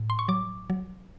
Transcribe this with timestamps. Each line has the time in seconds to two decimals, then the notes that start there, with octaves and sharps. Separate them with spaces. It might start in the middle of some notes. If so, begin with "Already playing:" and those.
Already playing: A2
0.10 C6
0.19 C#6
0.28 F#3 D6
0.70 F#3